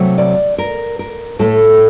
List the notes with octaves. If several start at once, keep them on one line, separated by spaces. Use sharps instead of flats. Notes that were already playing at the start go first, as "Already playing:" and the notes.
Already playing: C3 F#3 A3
D5
A#4
A#4
A2 A3 A4